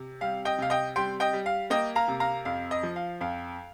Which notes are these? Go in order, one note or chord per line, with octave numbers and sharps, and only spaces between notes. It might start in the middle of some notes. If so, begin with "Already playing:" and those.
Already playing: C3
G3 F5
D#5 G5
C3 F5
D#5 G5
G3 G5 C6
D#5 G5
G3
F5
A#3 D#5 G5
F5 A#5
C3
F5 A#5
F2 F5
D#5
F3
F5
F2 F5